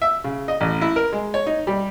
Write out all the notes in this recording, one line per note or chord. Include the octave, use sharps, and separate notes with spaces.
E5
C#3
D#5
A1
E4
A#4
G#3
C#5
D#4
G3